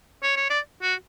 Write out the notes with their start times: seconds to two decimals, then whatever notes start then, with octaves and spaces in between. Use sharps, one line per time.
0.23 C#5
0.37 C#5
0.50 D5
0.82 F#4